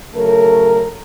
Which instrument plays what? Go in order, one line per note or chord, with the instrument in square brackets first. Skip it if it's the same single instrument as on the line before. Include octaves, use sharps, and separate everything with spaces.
[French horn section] C#3 F#3 A3 A4 A#4